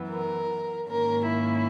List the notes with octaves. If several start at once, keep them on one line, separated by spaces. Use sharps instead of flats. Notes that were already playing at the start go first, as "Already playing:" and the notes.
Already playing: F#2 E3 B3
A#4
G#2 D#3 A#3 C#4 A#4
E4